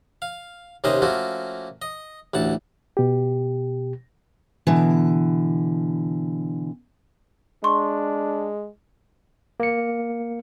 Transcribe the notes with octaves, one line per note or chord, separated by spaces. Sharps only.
F5
D#2 C3 C#4 B4 C5 D#5
F3 A3 A#3 C#4 F#4
D#5
A1 D2 F#5 A5
B2 G4
B2 D3 E3
G#3 D4 C6 C#6
A#3 C#7